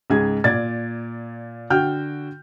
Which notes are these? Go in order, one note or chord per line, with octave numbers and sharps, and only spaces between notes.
C#2 G#2 G#4 G#6
A#2 D5 G#6 A6
D3 F#4 G5 F6 G6